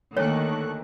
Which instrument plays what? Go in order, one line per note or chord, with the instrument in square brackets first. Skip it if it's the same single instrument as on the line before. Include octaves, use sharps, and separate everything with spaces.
[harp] D2 A#3 [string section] D#3 [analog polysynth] A4 C#6 F#6 [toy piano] C#5